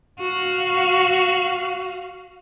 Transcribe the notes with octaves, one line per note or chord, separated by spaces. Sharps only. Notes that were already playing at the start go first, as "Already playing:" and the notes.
F#4 F5